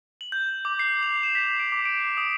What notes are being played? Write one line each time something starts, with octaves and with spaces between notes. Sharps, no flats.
F#7
G6
D6
C7
F7
E7
B6
D7
D6
D7
C7
D#6